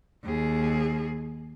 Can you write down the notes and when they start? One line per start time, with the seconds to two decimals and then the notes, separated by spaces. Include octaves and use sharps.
0.24 D#2 G#4